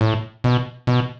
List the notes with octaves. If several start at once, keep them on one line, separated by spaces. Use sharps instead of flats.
A2
B2
B2